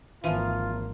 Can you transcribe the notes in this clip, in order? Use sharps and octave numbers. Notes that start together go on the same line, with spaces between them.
G#1 E3 F3 A#3 F4